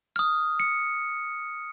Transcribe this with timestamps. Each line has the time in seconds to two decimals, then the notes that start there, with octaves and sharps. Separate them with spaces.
0.16 D#6 F6
0.60 C#7